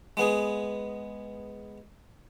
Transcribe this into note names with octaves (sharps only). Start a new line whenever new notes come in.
G#3 B3 G#4